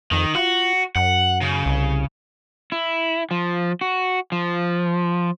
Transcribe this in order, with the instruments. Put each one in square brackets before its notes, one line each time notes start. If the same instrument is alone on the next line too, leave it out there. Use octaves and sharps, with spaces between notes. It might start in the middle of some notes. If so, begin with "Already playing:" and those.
[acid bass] F2 [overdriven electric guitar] D#3
[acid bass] F4 [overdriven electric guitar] F#4
[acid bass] F#2 [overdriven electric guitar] F#5
[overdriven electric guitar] C#3
[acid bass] C2
[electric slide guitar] E4
F3
F#4
F3